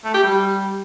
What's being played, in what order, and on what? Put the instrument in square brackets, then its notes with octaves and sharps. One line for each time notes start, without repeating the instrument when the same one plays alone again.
[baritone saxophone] A3
G4
G3